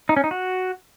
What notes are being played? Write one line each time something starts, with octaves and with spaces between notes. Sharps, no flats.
D#4
C#4
D#4
F#4